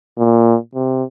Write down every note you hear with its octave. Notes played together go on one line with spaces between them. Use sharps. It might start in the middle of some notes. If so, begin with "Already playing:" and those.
A#2
C3